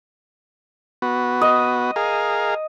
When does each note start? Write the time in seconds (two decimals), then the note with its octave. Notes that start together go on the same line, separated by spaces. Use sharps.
1.02 B3 F#4
1.41 D#5
1.96 G#4 A#4 F5